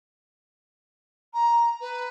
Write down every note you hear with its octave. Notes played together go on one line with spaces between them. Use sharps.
A#5
B4